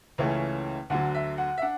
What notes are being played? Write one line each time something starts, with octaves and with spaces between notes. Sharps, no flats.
C#2 C#3 E3 A3 C#4
D2 D3 F#3 F#5
E5
F#5
E5
D4 F#5